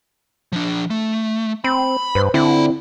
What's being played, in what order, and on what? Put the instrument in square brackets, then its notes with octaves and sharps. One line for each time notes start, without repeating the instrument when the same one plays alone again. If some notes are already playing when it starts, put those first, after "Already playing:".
[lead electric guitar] F3 D4
A3
[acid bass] C4 [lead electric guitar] B5
[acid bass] G2 [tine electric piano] B4 C5
[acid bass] D3 [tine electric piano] C4 E4 [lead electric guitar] F4 B5